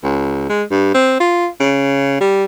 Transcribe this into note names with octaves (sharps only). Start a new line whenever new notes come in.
C#2
G#3
G2
C4
F4
C#3
G3